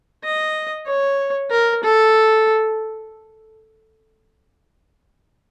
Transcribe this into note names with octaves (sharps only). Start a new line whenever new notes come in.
D#5
C#5
A#4
A4